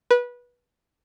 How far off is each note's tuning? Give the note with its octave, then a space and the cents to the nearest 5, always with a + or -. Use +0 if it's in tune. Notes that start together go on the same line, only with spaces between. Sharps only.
B4 -20